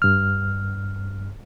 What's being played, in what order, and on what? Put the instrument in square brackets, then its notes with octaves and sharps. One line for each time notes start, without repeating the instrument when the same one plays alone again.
[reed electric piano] G2 F6